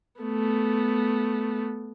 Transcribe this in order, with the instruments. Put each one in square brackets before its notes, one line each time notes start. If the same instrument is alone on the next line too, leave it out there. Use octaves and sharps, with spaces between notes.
[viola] A3 B3